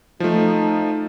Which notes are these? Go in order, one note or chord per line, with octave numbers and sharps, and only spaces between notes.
F3 A3 D#4